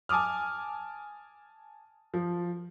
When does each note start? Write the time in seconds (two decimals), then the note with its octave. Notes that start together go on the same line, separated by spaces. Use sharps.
0.09 G#5 A5 D6 D#6 F6
2.14 F3